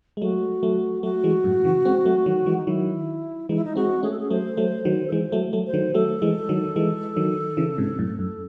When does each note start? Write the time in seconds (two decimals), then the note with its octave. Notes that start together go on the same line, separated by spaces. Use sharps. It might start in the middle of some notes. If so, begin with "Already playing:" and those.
0.17 G#3
0.21 F#3 A3 F#4
0.63 F#3 A3
1.03 F#3 A3 F#4
1.24 E3 G#3
1.44 F#2 A2
1.65 C#3 E3
1.85 G#3 C4
2.05 F#3 A3
2.26 D#3 F#3
2.46 E3 G#3
2.57 D#4
2.66 D#3 F#3 E4
3.49 E3 G#3 D#4
3.56 E4
3.65 D#4
3.76 G#3 C4 F#4
4.03 A3 C#4 G#4
4.11 A4
4.20 G#4
4.30 F#3 A3 C5
4.57 F#3 A3
4.85 D#3 F#3
5.08 A4
5.12 E3 G#3 C5
5.32 F#3 A3
5.53 F#3 A3
5.67 C5
5.74 D#3 F#3
5.94 F#3 A3 A4
6.22 E3 G#3
6.49 D#3 F#3
6.76 E3 G#3
7.16 D#3 F#3
7.57 C#3 E3
7.78 G#2 C3
7.99 F#2 A2
8.19 F#2